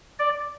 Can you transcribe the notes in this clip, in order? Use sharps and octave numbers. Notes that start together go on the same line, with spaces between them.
D5